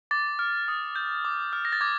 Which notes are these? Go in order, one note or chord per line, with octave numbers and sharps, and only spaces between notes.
D6 A6
F6
D#6
G6
D6
F6
A#6
A6
D6 G#6